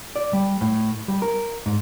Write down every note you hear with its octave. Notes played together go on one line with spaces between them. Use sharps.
D5
G3
A2
G3
A#4
G#2